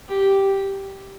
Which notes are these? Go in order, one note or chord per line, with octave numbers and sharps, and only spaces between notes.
G4